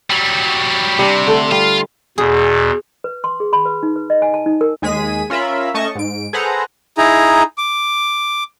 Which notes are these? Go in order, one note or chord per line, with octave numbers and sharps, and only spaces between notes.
F#3 G3
C3 G3 D4
D3 A3 A4
G3 F4
E2 B2 G#4
B4
C6
G#4
B5
B4
D#4
B4
D#5
G#5
A5
D#4
A#4
D#2 G#3 G#4 B6 D#7
C#4 F4 A#4 E5 B5
A3 C#4 D#5 A5 C#6
G#2 D7
G#4 A4 B4 C5 F#5 A#5
D#4 E4 G#4 A#5
D6